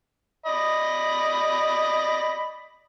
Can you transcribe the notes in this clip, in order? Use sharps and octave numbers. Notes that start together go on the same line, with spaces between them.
D5 D#5 B5